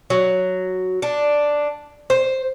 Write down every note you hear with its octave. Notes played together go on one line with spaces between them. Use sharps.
F#3
D4
C5